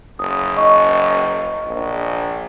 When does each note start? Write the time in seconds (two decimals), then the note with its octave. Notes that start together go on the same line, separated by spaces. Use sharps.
0.19 F#1 D#6
0.57 D#5 C#6
1.67 A#1